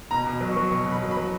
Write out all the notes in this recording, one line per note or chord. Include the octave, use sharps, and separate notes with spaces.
B2 A#5
B2
F#3
C#6
F#3
B2 C#6
B2
B5
F#3
B5
F#3